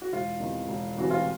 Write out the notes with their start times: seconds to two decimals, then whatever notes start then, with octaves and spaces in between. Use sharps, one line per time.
0.02 F#4
0.12 E1 F4
0.40 E2 C3 D#3
0.68 E1
0.95 D2 C3 E3 F#4
1.11 F4